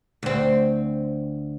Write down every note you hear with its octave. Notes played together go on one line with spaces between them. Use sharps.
D2 C4